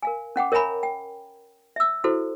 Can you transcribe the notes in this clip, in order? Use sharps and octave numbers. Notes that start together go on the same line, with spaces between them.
A#4 F5 G#5
C#4 F#5 G5 D6
A#4 C#5 E5 G#5 A#5 B5
G5
E5 E6
E4 F#4 A4 C5